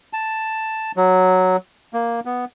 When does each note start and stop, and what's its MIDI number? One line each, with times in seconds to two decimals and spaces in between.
0.13 0.92 81
0.97 1.57 54
1.94 2.20 58
2.25 2.45 59